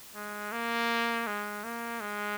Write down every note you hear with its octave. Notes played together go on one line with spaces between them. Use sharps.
G#3
A#3
G#3
A#3
G#3